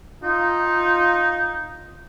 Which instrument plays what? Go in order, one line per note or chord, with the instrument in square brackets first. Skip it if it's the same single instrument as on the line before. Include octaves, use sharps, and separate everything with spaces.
[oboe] D#4 [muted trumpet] F4